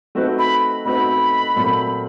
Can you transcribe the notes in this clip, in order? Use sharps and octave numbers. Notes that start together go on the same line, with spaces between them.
A3 C4 D#4 F#4 B4
B5
A3 C4 D#4 F#4 B4 B5
A#2 F#3 A3 C4